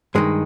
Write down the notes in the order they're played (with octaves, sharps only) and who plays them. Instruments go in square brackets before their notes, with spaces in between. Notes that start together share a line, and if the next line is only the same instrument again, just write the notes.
[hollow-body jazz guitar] G2 D#3 G#3